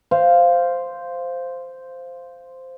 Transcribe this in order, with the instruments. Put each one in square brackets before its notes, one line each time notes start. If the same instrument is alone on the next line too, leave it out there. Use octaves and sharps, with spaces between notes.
[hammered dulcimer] C5 F5